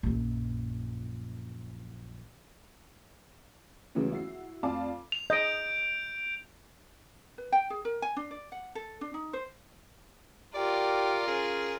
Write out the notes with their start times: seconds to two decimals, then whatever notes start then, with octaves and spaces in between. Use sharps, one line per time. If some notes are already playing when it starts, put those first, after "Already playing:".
0.03 A#1 F#2
3.95 C#2 C#3 E3 F#3 A3 B3
4.12 E4 F#4 C7
4.63 F2 A3 D5 F5 A5 D6
5.12 F7
5.30 D#5 G6 D7
7.38 B4
7.52 G5
7.70 G#4
7.85 A#4
8.02 G#5
8.16 D4
8.31 D5
8.52 F#5
8.75 A4
9.01 D4
9.14 D#4
9.33 C5
10.55 F4 G4 A#4 D5
11.28 C#4 G#4